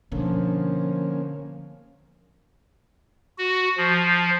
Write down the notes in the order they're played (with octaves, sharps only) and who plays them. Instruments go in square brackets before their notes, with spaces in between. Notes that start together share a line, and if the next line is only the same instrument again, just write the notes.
[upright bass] B2 D3 [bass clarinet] F3 [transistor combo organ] A#3 C#4
[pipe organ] F#4
F3